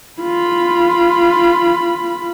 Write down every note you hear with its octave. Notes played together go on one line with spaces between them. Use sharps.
F4 B5